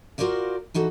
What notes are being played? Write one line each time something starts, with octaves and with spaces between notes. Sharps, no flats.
F4 F#4 A#4 C5 D5 F5
E3 D#4 F#4 A4